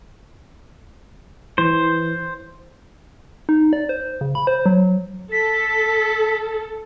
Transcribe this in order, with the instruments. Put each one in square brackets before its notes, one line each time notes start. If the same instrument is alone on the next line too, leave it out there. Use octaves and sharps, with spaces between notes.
[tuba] E3 [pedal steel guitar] C5
[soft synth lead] D#4
D5
C5
C#3
B5
C5
F#3
[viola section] A4 [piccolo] B6